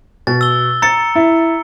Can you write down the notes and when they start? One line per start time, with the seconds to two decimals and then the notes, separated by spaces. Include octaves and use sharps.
0.27 B2 A6
0.41 E6 G7
0.82 A#5 A6 C#7
1.15 E4